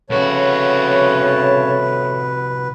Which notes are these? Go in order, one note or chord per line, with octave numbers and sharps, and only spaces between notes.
C2 A2 C#3 F#4 B4 C#5 A5